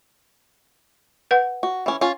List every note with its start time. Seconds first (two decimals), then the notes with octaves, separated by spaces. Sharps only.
1.31 B4 F#5
1.63 F#4
1.86 E3 C#4
2.01 C#4 F4